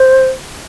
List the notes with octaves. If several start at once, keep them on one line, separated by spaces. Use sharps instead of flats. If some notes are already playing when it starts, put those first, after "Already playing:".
Already playing: C5